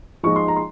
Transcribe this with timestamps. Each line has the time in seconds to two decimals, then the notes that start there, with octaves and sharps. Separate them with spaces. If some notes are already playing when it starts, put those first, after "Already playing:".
0.23 F3 G#3 D#4 C#6
0.36 C6
0.48 A#5
0.56 C6